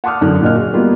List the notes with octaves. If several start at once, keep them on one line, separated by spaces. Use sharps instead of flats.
F#5 A5 C6 D6 D#6 F6
F#2 D3 F#6
A#2 D#5 F6
F#4 G#4
G3 A#3 B3 F4